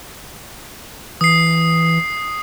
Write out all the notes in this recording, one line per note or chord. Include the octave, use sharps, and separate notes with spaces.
E3 D#6 C7